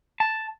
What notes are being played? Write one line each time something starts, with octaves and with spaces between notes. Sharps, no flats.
A5